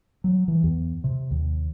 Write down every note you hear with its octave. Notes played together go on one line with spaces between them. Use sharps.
F#3
E3
E2
C3
D#2